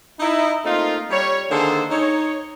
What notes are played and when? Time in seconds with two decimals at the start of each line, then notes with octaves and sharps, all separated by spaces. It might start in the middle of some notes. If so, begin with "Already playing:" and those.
0.19 D#4 E4
0.65 A3 A#3 C4 D#4 F4
1.10 G3 C#5
1.50 D3 D#3 A#3 G#4 A4 C5
1.89 D#4 C#5